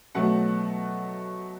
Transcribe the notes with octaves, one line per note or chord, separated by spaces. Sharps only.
B2 F#3 A3 F#5